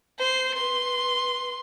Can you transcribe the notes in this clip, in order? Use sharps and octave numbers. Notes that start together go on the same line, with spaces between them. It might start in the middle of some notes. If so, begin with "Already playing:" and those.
C5 C7
B4 C6